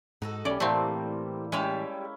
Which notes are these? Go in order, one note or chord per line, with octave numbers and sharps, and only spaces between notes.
G#2 D#4 F#4 A4
B1 G3 A3 C#4 D5
A2 C3 E3 G3 A3 A#3 C4 C5
G3 G#3 C#4 E4 G4 A5